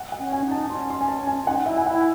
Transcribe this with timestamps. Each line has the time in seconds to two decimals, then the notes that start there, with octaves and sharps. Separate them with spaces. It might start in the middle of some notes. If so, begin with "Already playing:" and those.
Already playing: F#5
0.12 F#5
0.19 C#4
0.32 G#5
0.45 D#4
0.51 A5
0.70 C#4 C6
0.90 C6
1.01 G#5
1.08 A5
1.27 G#5
1.47 D#4 F#5
1.66 E4 E5
1.77 G#5
1.86 E4 F#5